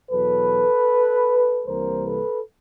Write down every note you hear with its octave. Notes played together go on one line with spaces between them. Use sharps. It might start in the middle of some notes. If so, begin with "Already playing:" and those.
E2 B2 F#3 A4 B4
C2 C3 E3 G3 A#3 A#4 C5
A4 B4